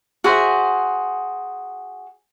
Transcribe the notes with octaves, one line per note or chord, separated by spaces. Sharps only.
F#4 G#4 C5 E5